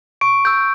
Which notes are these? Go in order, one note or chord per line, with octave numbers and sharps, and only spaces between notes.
C#6 D7
E6 G6